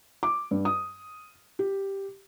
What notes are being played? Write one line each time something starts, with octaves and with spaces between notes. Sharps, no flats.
D6
G2
D#6
G4